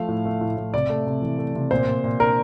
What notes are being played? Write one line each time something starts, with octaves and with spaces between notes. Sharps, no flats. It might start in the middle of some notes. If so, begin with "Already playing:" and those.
Already playing: F3 A3 F5
A2
A3
A2
A2
C3 D5
A3
C3
E3
A3
C3
A#2 C5
A#2
A#2
D4 A#4